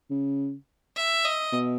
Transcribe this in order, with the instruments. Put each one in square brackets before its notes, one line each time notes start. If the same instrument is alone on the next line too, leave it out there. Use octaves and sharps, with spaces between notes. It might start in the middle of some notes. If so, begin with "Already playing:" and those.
[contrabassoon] C#3
[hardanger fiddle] E5
D#5
[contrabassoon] B2